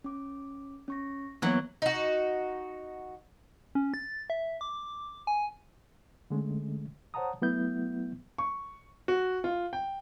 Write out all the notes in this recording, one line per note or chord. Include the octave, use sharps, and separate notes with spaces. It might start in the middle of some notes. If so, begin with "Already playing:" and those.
C#4 D6
C#4 C#6 A#6
E3 F#3 A#3 B3 C#5 F#5
D#4 F#4
C#4
A6
E5
D6
G#5
D3 G#3 A3 C#4
C5 C#5 F#5 A5 A#5 D#6
F#3 A3 B3 E4 E5 G6
C#6
F#4
F4
G5